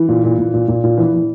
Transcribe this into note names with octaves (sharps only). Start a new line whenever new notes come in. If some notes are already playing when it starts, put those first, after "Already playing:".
Already playing: E3
A#2
A#2
A#2
A#2
A#2
A#2
E3
E3